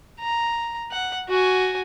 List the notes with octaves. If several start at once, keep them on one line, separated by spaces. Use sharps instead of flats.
A#5
F#5
F#4 G#5